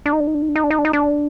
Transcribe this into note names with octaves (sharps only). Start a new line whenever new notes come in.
D4
D#4
D4
D#4
D4
D#4
D4
D#4
D4
D#4
D4
D#4
D4